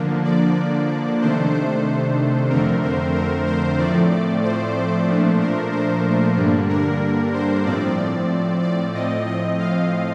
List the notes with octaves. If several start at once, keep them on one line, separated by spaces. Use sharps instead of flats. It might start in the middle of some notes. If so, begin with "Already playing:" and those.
Already playing: D3 F3 A#3 D4
D5
C3 D#3 A3 D4 C5
C5
F2 D3 A3 C4 A#4
C5
A#4
C5
A2 F3 A3 C4 D5
D5
C5
C5
A#2 F3 A3 D4
A#4
C5
G2 D3 G3 A#3 D4
A#4
C5
A2 F3 C4 D5
D5
A2 F3 C4 D#5
D#5
F5